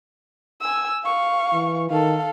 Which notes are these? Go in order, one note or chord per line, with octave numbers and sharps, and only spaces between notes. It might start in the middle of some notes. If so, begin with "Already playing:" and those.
G#5 E6
F5 C#6
E3
D#3 A4 F5